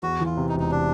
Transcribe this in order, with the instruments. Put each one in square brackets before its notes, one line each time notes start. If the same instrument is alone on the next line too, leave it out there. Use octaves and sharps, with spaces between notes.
[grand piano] E2 [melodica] F#4
[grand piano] E3
[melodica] F4
[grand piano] C3
[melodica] D#4
[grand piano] E1
[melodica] D#4
[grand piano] C3 [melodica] D4